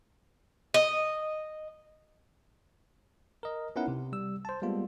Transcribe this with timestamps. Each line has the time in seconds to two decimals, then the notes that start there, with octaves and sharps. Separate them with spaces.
0.74 D#5
3.43 A#4 D#5
3.76 B3 C#4 D#4 E4 A#4 F#5
3.88 C3
4.12 G3 E6
4.45 C5 A5
4.62 G3 G#3 A#3 B3 F4